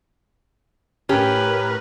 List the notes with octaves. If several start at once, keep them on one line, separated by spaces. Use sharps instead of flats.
A2 C#4 G4 A#4 B4